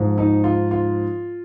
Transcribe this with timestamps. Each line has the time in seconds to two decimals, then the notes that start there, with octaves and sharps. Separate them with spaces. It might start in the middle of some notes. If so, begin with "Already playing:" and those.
Already playing: G#2 F3
0.18 D#4
0.44 F4
0.71 F4